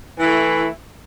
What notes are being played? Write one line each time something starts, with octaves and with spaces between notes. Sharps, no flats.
E3 A3 E4